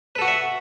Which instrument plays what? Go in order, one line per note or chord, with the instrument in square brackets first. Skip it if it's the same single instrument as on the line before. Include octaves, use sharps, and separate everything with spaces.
[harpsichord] B4
A4
F#4
F#5
E5